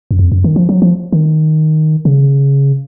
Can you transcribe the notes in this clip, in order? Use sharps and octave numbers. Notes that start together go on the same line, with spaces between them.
F#2
F2
F#2
D#3
F3
F#3
F3
D#3
C#3